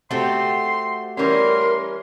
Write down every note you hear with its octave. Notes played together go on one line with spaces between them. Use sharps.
A3 C4 F#4 G4 C6
E3 G3 C#4 A#4 C6